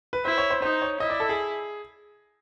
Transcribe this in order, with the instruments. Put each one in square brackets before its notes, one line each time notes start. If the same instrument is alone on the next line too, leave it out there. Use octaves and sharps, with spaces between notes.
[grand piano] B4
[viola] E4 [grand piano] C5
[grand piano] C#5
C5
[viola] D#4 [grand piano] C5
[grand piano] C#5
[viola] E4 [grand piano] D#5
[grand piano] D5
A4
G#4